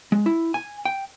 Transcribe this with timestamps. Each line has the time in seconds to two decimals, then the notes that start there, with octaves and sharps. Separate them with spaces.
0.12 G#3
0.26 E4
0.54 G#5
0.85 G5